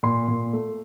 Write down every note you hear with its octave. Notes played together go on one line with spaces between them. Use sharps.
A#2 C6
A#2
A3